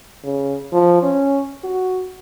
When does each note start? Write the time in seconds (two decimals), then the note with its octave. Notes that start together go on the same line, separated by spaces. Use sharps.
0.24 C#3
0.72 F3
1.02 C#4
1.63 F#4